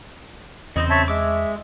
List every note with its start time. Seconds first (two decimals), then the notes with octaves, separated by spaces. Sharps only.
0.76 E2 C#3 C4 C5 D#5
0.90 C#5 E5 A5
1.08 G#3 E5 D6